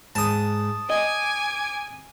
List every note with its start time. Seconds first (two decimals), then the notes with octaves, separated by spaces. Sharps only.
0.15 G#2 A5 D#6
0.90 D#5 G#5 D6